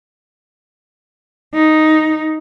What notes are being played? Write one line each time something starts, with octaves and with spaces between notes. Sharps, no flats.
D#4